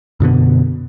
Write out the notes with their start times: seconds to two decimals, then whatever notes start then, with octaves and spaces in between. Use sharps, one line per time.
0.20 F#2 B2 D3 B3